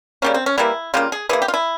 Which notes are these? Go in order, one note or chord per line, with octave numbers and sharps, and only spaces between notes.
C#3 G3 A#3 C#4
C4
C#4
E3 G3 A#3 E4
C#3 G3 A#3 F4
G#4
E3 A#3 G#4
G4
F4
E4